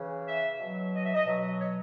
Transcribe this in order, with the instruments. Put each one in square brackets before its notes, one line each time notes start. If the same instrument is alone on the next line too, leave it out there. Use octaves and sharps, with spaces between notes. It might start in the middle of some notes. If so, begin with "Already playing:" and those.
Already playing: [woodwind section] C#3 E3
E5
B2 F#3
D#5
E5
D#5
B2 F#3
C#5